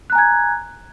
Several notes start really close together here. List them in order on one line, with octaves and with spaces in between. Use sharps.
F#6 A#5 G#5 G#6